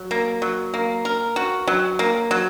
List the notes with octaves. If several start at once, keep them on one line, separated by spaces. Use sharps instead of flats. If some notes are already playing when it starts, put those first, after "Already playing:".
Already playing: F#3
A#3
F#3
A#3
A#4
F#4
F#3
A#3
F#3